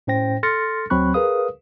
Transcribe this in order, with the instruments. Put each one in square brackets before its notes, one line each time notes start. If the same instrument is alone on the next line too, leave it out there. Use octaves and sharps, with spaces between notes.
[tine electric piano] A2 C#4 C5 G5 A#6
A4 C6 F6 A6 A#6 C#7
D2 F#3 C4 B5 C#6 F#6
G#4 A#4 B4 F5 D#6